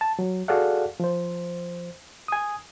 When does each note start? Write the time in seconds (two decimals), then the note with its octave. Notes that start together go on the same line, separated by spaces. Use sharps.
0.01 A5
0.19 F#3
0.48 F#4 G#4 A4 D5 F5 F#5
1.00 F3 C5
2.28 G#5 D#6